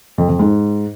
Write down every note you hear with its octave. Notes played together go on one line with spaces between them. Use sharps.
F2
F2
G#2